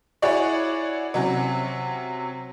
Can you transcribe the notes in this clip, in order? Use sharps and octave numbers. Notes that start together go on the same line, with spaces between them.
E4 F#4 G#4 C#5 D5
C3 F#3 C#4